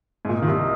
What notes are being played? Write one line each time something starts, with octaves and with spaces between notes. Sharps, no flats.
G#2
A#2 A#3 F4 A#4 D#5
D#3
C2 C3